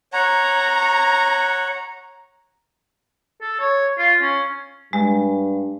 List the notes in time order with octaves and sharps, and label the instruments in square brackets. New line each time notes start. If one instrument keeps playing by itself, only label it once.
[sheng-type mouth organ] C#5 F#5 [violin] A#5
[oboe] A4
C#5
F4
C#4
[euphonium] G2 [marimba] G#3